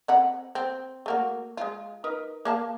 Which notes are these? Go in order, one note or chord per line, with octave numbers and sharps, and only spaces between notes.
C4 F#5 B5
C4
A3 A#3 F#4
G#3 F4
D#4 A#4 B4
A#3 F5 A5